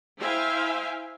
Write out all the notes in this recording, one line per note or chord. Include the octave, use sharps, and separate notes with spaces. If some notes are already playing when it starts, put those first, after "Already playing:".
E4 C5 E5 F5 G5 G#5